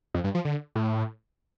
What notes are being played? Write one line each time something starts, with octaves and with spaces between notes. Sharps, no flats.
F2
G2
F3
D3
A2